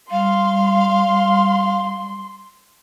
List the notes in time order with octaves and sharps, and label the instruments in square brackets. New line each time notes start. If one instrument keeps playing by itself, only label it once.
[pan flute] G3 [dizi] F5 [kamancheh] C6